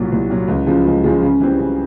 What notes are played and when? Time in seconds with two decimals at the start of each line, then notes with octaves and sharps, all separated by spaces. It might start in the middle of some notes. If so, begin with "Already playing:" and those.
Already playing: C2 A#2 F#3
0.12 C2
0.30 A#2 F#3
0.48 C#2
0.67 C#3 F3 G#3
0.85 C#2
1.04 C#3 F3 G#3
1.23 C#3
1.40 E3 G3 C4
1.59 C#3